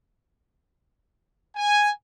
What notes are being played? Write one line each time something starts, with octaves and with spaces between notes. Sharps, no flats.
G#5